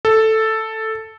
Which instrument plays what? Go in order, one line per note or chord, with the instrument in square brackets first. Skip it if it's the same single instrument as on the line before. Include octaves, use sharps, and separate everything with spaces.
[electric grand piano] A4